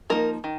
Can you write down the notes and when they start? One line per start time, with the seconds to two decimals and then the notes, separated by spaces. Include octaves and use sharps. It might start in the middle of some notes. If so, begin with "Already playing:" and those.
0.10 F3 A#3 D#4 A#4
0.44 D#3